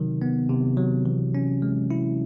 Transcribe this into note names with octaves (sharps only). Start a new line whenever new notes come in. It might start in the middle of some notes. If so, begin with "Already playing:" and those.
Already playing: C3 D#3 F#3
B3
C3
F#3
E3
C#4
G#3
E4